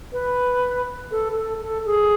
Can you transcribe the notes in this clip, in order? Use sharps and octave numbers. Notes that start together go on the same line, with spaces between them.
B4
A4
A4
A4
G#4